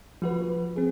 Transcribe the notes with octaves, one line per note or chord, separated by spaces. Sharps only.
F3 F#4 B4
C4 G#4